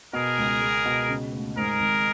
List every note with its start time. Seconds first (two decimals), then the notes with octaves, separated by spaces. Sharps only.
0.13 B2 G#4 A#4
0.37 C#2
0.61 G#3
0.85 B2
1.08 C#3
1.32 D2
1.56 G#2 G#4 A#4
1.80 G#1